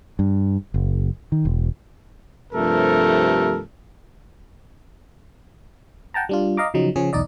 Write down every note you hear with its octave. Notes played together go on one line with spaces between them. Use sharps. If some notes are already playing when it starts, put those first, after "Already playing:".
G2
F#1
D#3
E1
G2 C3 F3 A3 A4 A#4
F#5 G5 A5 A#5
G3 D4 F4
D#5 F5 A#5 D6
C#3 F3 F#3 D#4
C#3 F3 C#4 G#4
B1 E2 D#4 D5 D#5